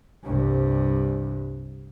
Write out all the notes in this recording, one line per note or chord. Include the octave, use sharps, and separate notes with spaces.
C2 G2